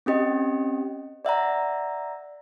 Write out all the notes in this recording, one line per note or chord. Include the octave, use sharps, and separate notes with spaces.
C4 C#4 G4 D#5
D5 E5 F#5 A#5